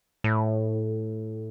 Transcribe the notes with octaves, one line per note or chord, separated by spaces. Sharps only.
A2